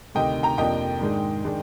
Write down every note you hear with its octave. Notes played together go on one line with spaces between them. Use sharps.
D2 C3 D#3 D#5 G5
G5 A#5
F2 C3 F3 A#3 D4 D#5 G5
G#2 D#3 G#3 D4
D#3 G#3 D4